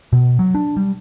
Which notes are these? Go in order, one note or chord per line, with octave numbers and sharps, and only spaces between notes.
B2
F#3
D4
G3